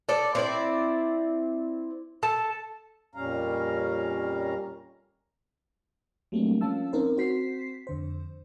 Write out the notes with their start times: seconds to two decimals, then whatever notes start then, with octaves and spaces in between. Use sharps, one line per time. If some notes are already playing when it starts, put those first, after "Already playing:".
0.09 A4 D5
0.35 C4 E4 D5
2.23 A4 A5
3.15 F2 A#2 G3 C#4 F5 A#5
6.32 F#3 G3 A3 A#3 C4 D4
6.61 F3 A#3 C#4 F5 A5 E6
6.93 C4 C#4 D#4 A#4 C5
7.17 C4 F#4 C5 B6 C7
7.87 F2 D3 C5